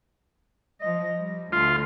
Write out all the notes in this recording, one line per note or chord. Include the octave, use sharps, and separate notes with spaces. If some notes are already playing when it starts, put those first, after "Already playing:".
F3 D#5
G3
D2 F4